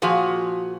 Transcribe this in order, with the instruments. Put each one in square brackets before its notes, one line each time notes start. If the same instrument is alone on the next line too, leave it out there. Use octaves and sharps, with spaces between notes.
[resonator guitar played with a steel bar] A#2 F3 F#4 G#4